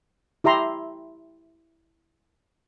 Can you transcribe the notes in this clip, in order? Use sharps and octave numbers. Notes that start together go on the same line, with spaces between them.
E4 G4 E5 A#5 C6